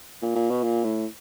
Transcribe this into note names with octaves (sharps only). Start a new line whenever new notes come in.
A#2
A#2
B2
A#2
A2